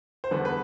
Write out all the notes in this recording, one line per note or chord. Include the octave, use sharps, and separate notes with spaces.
C5
E2 D3 G3 B4
B4